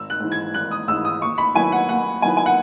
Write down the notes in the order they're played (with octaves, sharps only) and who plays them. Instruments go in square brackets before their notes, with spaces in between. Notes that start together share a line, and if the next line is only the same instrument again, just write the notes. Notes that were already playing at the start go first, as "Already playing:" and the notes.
Already playing: [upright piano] G#1 E6
F#6
G#2 E3
G#6
G#1 F#6
D#6
G#2 E3 E6
D#6
D#2 C#6
B5
D#3 F#3 B3 E4 G#5
F#5
D#2 F#5
D#3 F#3 B3 E4 G#5
G#5
F#5